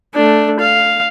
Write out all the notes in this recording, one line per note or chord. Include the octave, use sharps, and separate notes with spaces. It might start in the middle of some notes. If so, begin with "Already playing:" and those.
A3 D4
F5